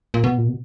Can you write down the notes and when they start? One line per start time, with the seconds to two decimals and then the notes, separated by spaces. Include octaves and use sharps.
0.14 A#2
0.24 B2
0.38 A#2
0.48 B2